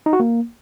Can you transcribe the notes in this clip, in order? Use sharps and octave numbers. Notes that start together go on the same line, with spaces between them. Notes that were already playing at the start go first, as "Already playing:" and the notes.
D#4
F#4
A#3